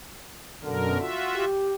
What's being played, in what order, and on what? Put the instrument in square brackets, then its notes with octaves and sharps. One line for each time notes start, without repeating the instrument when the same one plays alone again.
[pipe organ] F#2 B2 A#4 [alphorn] D3
[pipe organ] F4 F#4 E5
[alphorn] G4